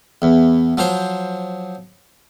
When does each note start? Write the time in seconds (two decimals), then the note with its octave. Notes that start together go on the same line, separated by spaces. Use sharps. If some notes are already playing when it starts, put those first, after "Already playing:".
0.22 E2
0.77 F3 F#3 C5